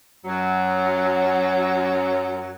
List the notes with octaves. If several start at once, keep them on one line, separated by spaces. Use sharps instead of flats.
F#2 F#3